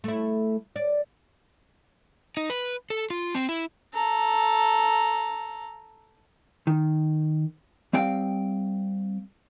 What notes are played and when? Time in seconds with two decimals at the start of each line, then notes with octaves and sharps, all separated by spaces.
0.04 A3 E4
0.76 D5
2.37 D#4
2.50 B4
2.90 A4
3.10 F4
3.35 C4
3.49 E4
3.94 A4 A#5
6.67 D#3
7.93 G3 C4 F5 G5